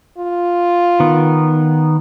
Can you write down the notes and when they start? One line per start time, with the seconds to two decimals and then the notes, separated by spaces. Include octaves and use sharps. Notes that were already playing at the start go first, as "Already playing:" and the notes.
0.18 F4
1.00 D#3 B3